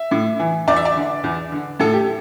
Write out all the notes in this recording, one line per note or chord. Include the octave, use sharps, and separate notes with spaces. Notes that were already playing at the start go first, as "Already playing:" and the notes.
Already playing: E5
A2
E3
E2 D5
E5
D5
D3
E2
D3
A2 A4
G4